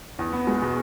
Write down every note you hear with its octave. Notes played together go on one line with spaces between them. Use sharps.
E2
B3
G#3
B2